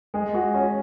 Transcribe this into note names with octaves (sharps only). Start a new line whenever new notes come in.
G#3
F#4
C#4